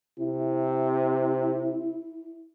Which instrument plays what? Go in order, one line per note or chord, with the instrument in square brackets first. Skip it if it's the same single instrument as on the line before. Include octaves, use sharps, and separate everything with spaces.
[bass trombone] C3 [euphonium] E4